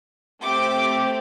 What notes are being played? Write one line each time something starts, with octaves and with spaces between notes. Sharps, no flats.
A3 C4 G4 D6